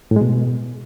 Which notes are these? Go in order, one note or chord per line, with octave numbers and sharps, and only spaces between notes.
A2
G#3
B2